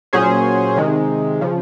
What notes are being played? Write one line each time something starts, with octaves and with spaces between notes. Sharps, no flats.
A#2 F#3 C#4 G#4 C5
C3 D#3 G#3
C#3 F3